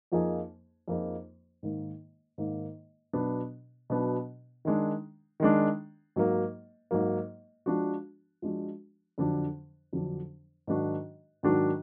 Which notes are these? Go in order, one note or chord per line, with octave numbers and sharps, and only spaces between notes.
F2 F3 A#3 D#4 G#4
F2 F3 A#3 D#4 G#4
G#2 D#3 A#3
G#2 D#3 A#3
B2 F#3 B3 D4
B2 F#3 B3 D4
D#3 G#3 D4
D#3 G#3 D4
G#2 F#3 A#3
G#2 F#3 A#3
F3 G#3 D4 F#4
F3 G#3 D4 F#4
F2 D3 F#3 D4
F2 D3 F#3 D4
G#2 D#3 F#3 D4 F#4
G#2 D#3 F#3 D4 F#4